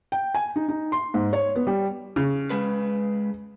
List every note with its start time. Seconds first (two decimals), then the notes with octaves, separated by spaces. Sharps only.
0.12 G5
0.35 G#5
0.56 D#4
0.68 D#4
0.92 C6
1.14 G#2
1.33 C#5
1.56 B3
1.67 G3
2.16 C#3
2.50 G#3 G#4 B4